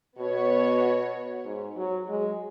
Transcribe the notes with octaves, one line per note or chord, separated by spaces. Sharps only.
B2 B3 F#4 C#5
G#2
F#3
G#3